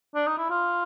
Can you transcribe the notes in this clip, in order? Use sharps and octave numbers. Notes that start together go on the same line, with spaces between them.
D4
D#4
E4
F4